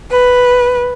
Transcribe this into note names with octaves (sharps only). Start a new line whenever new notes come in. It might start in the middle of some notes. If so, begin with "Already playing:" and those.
B4